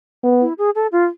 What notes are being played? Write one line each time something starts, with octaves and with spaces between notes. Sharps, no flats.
B3
E4
G#4
A4
F4